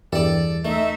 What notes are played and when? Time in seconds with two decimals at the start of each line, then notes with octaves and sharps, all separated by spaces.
0.13 E2 G2 E3 G3 A4 D5
0.65 A3 D#4 E5